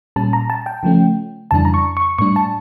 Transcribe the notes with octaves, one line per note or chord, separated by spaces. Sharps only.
A#2 G3 C#4 A5
A#5
A5
G5
C#3 F3 A3 C#4
F2 C#3 E3 G3 D4 A5
A#5
C#6
C#6
A2 G3 D4 C#6
A5